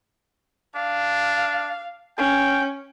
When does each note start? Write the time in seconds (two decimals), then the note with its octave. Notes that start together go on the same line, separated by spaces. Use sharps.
0.76 D4 F5
2.18 C#4 G5